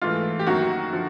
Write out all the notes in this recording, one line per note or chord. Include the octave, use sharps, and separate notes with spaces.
G#2 E3 A3 F4
G4
F#2 D#3 F#3 A#3 F#4
D3 F3